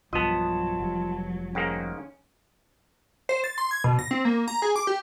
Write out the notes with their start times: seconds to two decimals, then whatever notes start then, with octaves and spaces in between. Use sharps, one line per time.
0.13 B1 G2 F3 F#3 B3 F4 D#5 A5
0.80 F1 F3 G3
1.55 G#2 D#3 A#3 C#4 G5
3.29 C5
3.44 A6
3.58 C6
3.71 G#6
3.84 B2
3.99 A#6
4.11 C4
4.25 A#3
4.48 A#5
4.62 G#4
4.76 D6
4.87 G4